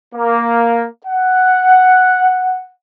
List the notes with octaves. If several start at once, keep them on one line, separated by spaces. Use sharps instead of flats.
A#3
F#5